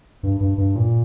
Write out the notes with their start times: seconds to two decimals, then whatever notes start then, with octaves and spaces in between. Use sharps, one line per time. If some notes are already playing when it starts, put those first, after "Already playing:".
0.23 G2
0.40 G2
0.58 G2
0.76 A#2